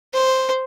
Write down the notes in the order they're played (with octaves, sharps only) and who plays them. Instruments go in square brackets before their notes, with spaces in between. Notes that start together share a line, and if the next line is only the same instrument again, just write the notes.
[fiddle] C5